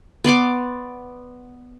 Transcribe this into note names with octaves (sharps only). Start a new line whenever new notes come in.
B3 D5 C6 D6